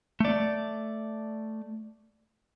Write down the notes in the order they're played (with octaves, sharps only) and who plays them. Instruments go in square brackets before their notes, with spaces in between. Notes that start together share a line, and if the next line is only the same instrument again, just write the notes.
[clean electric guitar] A3 D5